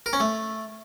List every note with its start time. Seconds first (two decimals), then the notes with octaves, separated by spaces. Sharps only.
0.06 A#4
0.13 C#4
0.20 A3